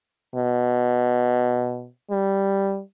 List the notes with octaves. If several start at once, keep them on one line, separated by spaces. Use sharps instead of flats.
B2
G3